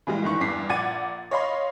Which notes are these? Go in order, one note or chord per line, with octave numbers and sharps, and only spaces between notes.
A#2 E3 G3 G#3
G1 D#3 E3 C#6
E2 G2 D6 B6 C7
A#1 F#5 D6 G#6 A6 D#7
C#5 D#5 F5 B5 C6